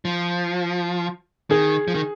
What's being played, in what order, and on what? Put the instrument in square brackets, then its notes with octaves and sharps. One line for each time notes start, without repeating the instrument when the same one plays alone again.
[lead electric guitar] F3
[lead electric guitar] D#3 [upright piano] G#4
[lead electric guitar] F3
D#3